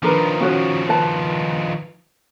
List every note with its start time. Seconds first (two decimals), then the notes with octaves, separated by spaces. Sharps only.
0.03 D#3 F3 D4 A#4 B4
0.41 C#4 F#4 C#5
0.89 B4 A5